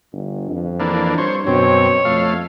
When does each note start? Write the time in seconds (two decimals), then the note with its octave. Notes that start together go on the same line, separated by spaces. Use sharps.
0.13 G1
0.50 F2
0.80 E3 A#3 D4
1.18 G2 C5 C#5
1.47 F#2 B2 C4 C#5
2.05 F2 A3 F5